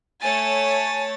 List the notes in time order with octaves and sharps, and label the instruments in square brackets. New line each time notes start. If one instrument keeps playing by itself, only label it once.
[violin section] A3 C#5 A6 [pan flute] G#5